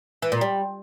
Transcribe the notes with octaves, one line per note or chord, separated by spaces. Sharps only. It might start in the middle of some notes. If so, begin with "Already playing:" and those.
E3
A#2
G3